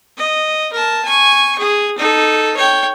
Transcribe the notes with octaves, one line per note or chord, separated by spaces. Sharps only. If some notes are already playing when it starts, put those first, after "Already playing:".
D#5
A#4 A5
G#5 C#6
G#4
D#4 A4
C#5 G5